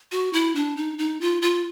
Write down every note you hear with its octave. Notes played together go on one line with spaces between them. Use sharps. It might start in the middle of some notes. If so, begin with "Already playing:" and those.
F#4
E4
D4
D#4
D#4
F4
F4